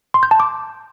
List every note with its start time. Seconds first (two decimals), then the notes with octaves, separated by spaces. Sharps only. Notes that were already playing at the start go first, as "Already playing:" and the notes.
0.14 C6
0.23 G6
0.31 A5
0.40 D6